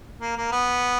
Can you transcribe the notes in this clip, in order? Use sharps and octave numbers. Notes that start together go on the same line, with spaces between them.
A#3
A#3
B3